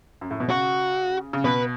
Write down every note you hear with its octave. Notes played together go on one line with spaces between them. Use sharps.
F#2
A2
B2
C#3 F#4
C#3
B2 B4